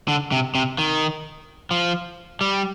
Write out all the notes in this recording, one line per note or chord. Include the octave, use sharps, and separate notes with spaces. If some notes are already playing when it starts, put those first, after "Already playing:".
D3
C3
C3
D#3
F3
G3